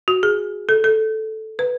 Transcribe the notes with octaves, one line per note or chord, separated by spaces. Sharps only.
F#4
G#4
A4
A4
B4